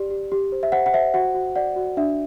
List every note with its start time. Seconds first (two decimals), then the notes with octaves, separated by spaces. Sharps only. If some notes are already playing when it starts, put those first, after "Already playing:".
Already playing: G4 D5
0.11 G4
0.32 G4
0.52 C5
0.63 E5
0.72 C5 F#5
0.86 F#5
0.93 C5 E5
1.14 F#4 F#5
1.35 F#4
1.56 D5 F#5
1.76 F#4
1.97 D4 E5